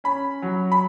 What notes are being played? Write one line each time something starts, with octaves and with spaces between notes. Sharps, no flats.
C#4 B5
F#3
B5